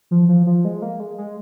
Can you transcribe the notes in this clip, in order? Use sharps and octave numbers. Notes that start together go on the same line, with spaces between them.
F3
F3
F3
G#3
A#3
G#3
G#3